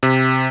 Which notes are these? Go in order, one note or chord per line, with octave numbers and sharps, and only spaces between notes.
C3